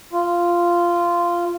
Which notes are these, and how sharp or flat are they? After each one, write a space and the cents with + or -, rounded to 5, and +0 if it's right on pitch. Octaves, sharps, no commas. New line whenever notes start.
F4 -10